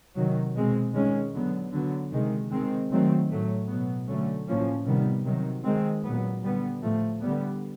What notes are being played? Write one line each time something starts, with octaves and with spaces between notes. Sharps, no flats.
C3 D#3 F#3
B2 G#3 C4
D#3 G#3 C#4
D3 F#3 B3
D3 F#3 B3
C3 D#3 G#3
D#3 G#3 C4
D#3 F#3 A3 C4
A2 F#3 A3
B2 F#3 B3
D3 F#3 A3 C#4
A2 F3 A#3 C#4
C3 D#3 G3 B3
C3 D#3 F#3
D#3 G#3 C4
A#2 F#3 B3
D3 G3 B3
A2 F3 A3
D3 G3 B3